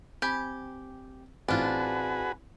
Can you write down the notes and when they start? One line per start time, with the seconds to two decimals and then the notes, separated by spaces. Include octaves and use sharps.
0.22 C4 G4 G#5 B5
1.48 A1 C4 D4 F4 F#4 G#4 B4